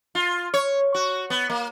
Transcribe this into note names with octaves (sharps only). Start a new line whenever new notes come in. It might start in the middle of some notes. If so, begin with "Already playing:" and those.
F4
C#5
F#4
B3
A#3